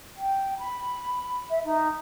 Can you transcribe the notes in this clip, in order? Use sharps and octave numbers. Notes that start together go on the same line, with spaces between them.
G5
B5
E5
D#4